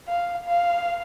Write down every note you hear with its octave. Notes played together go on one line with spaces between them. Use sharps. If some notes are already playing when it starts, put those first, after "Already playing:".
F5
F5